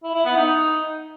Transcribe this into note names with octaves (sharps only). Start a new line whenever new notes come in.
E4
E4
B3
D#4